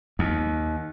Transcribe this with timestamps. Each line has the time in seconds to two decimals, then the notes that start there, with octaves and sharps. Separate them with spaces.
0.19 D#2